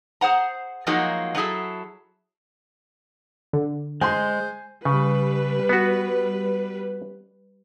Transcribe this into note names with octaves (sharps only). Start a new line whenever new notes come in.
G#4 C5 F#5 A#5
F3 F#3 G#3 A#3 D#4 F#4
F#3 D#4 E4 G#4 A4
D3
G#3 C5 G#5 C6
C#3 G3 B4
B3 F#4